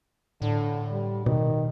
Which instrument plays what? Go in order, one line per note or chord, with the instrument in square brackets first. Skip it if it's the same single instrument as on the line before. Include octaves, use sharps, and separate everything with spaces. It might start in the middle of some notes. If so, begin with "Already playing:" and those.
[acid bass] A2 [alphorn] D3
[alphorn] G3
[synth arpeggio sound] B2 [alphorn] D#3